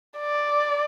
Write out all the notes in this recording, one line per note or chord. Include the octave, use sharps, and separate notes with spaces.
D5